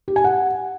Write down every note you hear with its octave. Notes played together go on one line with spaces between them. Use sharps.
G4
G#5
F#5